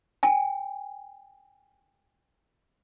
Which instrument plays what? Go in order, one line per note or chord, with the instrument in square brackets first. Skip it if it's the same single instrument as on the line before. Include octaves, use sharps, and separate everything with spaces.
[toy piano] G5 G#5